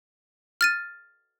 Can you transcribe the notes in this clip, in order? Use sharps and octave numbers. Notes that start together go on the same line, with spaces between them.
F6 A6 D#7